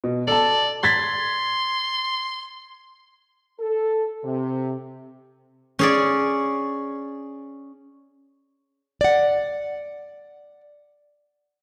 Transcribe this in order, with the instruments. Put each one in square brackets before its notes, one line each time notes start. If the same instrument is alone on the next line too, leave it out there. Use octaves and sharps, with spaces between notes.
[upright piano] B2
[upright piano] A4 A5 [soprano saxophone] D5
[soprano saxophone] C6 [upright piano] G#6 A6 B6
[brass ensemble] A4
C3
[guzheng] C#4 G#4 D5
[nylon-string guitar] D5 F#5